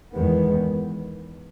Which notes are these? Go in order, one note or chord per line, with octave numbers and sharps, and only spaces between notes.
E2 D#3 G#3 B3